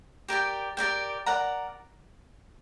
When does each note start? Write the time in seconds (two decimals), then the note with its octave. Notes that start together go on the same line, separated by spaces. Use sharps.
0.28 G4 A#4 D5 G5
0.77 G4 A#4 D5 G5
1.26 A#4 D5 F#5 A#5